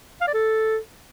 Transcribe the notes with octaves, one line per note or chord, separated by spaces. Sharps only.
F5
D5
A4